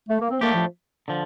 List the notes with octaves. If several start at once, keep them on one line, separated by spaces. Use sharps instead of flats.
A3
A#3
C4
A2 A3 A#3 D4 G4
F3
D3 F3